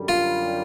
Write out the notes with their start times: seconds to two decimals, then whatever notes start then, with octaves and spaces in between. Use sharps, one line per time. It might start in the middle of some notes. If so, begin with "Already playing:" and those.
Already playing: F#2 D3 G3
0.08 F4